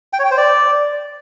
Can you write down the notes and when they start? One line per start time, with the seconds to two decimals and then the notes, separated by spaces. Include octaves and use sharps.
0.13 G5
0.19 C#5
0.25 G5
0.31 C5
0.37 D5